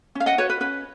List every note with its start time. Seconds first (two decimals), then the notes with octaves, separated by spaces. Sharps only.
0.15 C#4 F5
0.26 D#5 F#5
0.38 F#4 B4 C#5
0.50 B4
0.60 C#4 B4